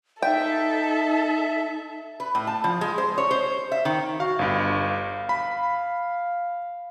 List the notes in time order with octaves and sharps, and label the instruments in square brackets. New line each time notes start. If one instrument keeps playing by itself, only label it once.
[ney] D#4 [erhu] A4 [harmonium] E5 [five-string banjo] G5
[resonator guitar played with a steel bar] B4
A2
A5
F3
G#3
C5
C#5
C5
E5
D#3
[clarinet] F#4 [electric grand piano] F5
[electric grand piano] G1 G2 [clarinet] F5
[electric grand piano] B5